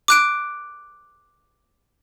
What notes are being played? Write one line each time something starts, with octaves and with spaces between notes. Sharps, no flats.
D6 F#6 D7